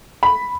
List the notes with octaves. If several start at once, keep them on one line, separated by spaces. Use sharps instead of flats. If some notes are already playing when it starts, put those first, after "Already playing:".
B5